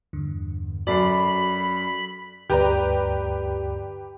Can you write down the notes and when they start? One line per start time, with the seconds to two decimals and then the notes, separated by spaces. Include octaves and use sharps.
0.13 E2 G2 D3
0.87 F#2 F#4 A4 D5 B5 C7
2.50 D2 G2 G4 B4 D5 A#5